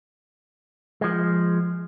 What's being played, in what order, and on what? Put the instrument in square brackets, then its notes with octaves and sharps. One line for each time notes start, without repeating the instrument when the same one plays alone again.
[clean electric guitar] F3 G#3